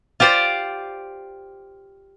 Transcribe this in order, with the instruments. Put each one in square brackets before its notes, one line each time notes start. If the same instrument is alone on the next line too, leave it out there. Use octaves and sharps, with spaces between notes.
[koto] F4 G4 C5 D5 F5